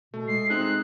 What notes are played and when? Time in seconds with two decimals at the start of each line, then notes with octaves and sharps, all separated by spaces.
0.14 B2 A3
0.28 G#3 C7
0.49 C4 D#4 G#4 F#6